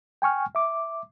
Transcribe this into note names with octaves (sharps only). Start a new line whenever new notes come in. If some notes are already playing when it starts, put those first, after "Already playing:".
G5 G#5 C#6 F6
E5 D6